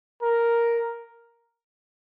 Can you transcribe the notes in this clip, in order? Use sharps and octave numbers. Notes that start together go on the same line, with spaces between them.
A#4